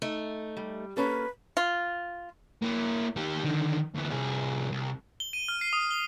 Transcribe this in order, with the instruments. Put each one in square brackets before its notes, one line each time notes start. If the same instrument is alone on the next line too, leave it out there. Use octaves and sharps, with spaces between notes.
[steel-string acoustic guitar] A3 D#4
[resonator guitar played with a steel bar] G3
[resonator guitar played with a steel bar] A#3 C#4 A4 [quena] B4
[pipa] F4
[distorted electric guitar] A#3 E4
D#3 G4
D3 D#3
D2 E3
C2 G#4
C2
[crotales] G7
D#7
F6
C7
D#6
G7